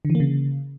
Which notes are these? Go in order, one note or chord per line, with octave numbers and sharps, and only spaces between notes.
D3
E3
A#3
C#3